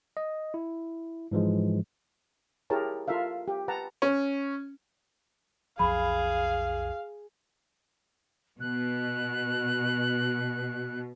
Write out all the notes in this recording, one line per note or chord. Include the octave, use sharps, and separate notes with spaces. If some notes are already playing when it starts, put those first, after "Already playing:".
D#5
E4
G#2 E3 F3 G#3
E4 G4 G#4 A#4 C#5 A5
F4 A4 A#4 E5 F5
G4
B4 F#5 A5 A#5
C#4
B1 F2 F3 G#4 F5 B5
B2 F#6